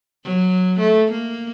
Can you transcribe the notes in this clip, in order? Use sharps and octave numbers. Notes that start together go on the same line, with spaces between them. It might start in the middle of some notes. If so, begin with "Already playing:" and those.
F#3
A3
A#3